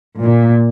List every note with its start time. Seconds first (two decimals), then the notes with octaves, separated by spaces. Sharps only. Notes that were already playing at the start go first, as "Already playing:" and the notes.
0.21 A#2